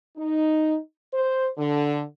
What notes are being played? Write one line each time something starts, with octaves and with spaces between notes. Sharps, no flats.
D#4
C5
D3